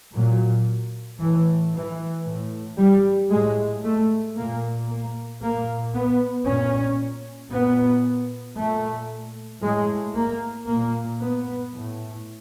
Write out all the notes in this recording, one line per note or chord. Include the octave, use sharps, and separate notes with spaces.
A#2 F#3
A2 E3
E3
A2
G3
A2 G#3
A3
A#2 A#3
A#3
A#2 A#3
B3
A#2 C#4
A#2 B3
A#2 A3
A2 G#3
A#3
A#2 A#3
B3
A2